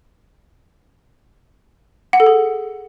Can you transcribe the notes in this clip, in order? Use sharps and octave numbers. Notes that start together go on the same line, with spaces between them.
F#5
A4
G#4